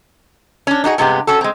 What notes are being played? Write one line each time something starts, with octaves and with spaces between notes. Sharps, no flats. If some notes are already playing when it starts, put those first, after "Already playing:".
C#4 D4
D4 D#4 F#4 G#4
G2 C3 G#3 B3 G4
C#4 F#4 A4
G#3 C4